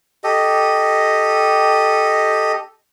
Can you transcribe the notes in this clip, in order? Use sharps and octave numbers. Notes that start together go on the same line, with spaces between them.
G4 A4 D#5